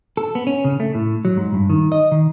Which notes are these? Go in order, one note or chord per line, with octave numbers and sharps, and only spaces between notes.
A4
B3
C#4
C#3
A3
A2
F#3
G#2
G2
D#3
D#5
D#3